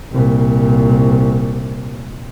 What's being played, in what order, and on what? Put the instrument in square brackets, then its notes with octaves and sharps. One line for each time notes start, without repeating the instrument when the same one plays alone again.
[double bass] C2 A#2